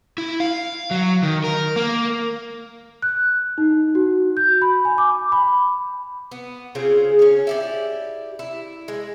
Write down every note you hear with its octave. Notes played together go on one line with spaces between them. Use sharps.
E4
F5
F#3
D#3
A#4
A#3
F#6
D#4
F#4
G6
B5
G#5
D6
B5
B3
C#3 C4 F4 G#4
C#4 C#5
E4 G4 D5
E4
G#3